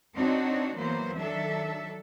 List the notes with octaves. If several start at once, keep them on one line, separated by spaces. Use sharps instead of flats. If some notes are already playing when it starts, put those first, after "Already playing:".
C4 D4 D#4 F#4 C#5
E3 F#3 A#3 B3 C5
D#3 F#3 D4 A4 E5